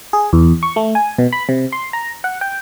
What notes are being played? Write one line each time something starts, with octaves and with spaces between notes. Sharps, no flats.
G#4
E2
C#6
A3
G#5
B2
B5
C3
C6
A#5
F#5
G5